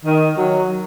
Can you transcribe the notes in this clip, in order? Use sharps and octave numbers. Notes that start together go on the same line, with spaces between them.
D#3
F#3